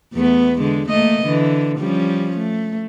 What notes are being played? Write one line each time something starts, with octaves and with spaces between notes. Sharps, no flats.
E2 A3 B3
D3 G#3
A3 A#3 D#5
D3 E3
F3 G3 C#4
A3